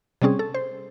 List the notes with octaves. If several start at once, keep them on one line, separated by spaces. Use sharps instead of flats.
C3 G3 C4 C#4 G#4
A4
C5